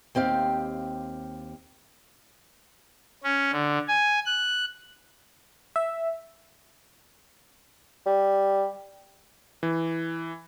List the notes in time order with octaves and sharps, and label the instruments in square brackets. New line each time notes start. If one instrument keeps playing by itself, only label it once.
[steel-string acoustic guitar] D#2 C4 G4 F5
[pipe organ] C#4
D3
G#5
F#6
[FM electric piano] E5
[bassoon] G3
[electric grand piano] E3